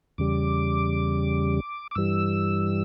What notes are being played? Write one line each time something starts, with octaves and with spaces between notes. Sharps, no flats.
E2 C#3 G3 D6
D6
G2 E3 G3 E6